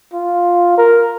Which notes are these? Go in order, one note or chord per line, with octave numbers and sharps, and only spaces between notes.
F4
A#4